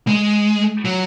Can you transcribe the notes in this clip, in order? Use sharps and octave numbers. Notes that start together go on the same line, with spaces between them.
G#3
F#3